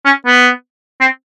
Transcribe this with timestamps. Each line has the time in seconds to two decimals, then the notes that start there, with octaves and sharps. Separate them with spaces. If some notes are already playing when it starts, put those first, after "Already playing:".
0.05 C#4
0.26 B3
1.01 C4